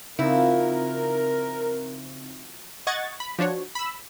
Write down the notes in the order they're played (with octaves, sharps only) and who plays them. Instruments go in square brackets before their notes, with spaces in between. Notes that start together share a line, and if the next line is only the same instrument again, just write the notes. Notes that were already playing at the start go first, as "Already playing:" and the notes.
[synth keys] C#3 C4 D#4 [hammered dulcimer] F3 F#4 [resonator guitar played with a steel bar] E4 [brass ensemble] A#4
[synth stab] D#5 F#5 C#6 G#6 A6
B5
F3 D4 F#4 C#5
B5 E6